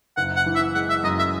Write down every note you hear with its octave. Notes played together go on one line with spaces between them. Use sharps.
F#1 F#5
F#5
E3
E5
G#3 F#5
E5
F#2 D#5
E5